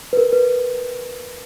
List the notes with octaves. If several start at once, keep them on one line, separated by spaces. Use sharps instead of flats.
B4
A#4
B4